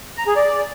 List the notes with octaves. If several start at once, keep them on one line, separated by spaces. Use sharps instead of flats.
A#5
G#4
D5